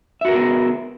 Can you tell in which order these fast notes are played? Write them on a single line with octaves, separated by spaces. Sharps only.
E5 F#4 A#4 G#4 B3